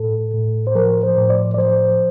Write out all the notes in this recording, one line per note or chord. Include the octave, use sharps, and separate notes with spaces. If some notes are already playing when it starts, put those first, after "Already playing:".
Already playing: A2 A4
A2
C5
F3 A#4
C5
A2
D5
D5
F3 C5